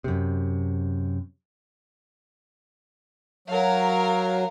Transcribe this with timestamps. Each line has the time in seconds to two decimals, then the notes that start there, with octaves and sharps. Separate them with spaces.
0.04 F#2 C3
3.48 F#3 A#4 F5